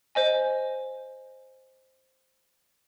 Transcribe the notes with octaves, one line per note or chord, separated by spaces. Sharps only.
C5 D#5 G#5